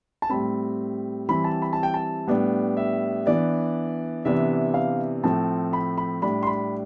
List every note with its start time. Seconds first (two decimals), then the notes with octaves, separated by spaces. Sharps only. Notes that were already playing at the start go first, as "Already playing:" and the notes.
0.22 A5
0.30 A2 G3 C4 B5
1.29 E3 G3 C4 B5
1.44 A5
1.62 B5
1.73 A5
1.83 G5
1.94 A5
2.27 A2 G3 B3 D4
2.77 E5
3.26 E3 B3 D4 D5
4.25 C3 E3 B3 D4 E5
4.74 F5
5.23 A2 F3 A3 C4 A5
5.73 B5
5.97 B5
6.22 A2 G3 D4 B5
6.43 C6
6.47 B5